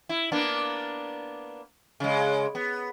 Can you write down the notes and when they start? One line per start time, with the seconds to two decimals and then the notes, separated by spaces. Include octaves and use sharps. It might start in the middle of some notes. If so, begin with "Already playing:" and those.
0.09 E4
0.32 A#3 B3 D4
2.00 C#3 G#3
2.55 B3